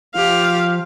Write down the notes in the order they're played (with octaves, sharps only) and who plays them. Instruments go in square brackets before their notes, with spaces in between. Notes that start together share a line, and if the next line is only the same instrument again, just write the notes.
[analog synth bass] F3 [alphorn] F4 [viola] G4 F5